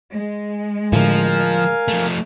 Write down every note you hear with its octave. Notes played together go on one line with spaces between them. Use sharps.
G#3
A2 D3 F3 A#4 F5 G#5
F3 A3